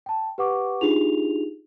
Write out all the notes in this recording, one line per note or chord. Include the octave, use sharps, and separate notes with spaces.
G5 A5
G4 B4 F#5 C#6 D6
D4 D#4 F4 G4 G#4 F7